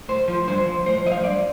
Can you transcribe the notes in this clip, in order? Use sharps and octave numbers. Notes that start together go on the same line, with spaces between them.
A2 C5
F3
G2 C5
F3
A2 C5
C5
F3 D#5
F5
G2 D5